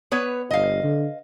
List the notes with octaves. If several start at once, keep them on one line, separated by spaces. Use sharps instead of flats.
B3 B4 C#5
G1 D#5 F5
D3